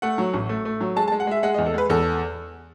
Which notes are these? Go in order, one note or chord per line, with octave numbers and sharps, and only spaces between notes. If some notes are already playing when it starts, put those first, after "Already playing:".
A3 F#5
F#3
A1
A3
A3
F#3
G#3 A5
A5
G#3
F#5
G#3 E5
G#3 F#5
D#5
E2
A4
G#3 B4
E2 A4